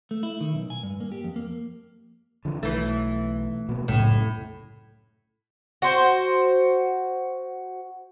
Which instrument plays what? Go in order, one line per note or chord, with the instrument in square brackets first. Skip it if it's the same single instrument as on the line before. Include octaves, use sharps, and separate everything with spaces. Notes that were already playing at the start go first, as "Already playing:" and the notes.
[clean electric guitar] A3
E4
D#3
B1
G#5
G2
A#3
G4
F2
A#3
[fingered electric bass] D3 F3
[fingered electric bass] B1 [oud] E3 A3
[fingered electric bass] B2 F3 A#3
[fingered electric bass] C2 F#2 C#3 [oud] A2
[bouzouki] F#4 C5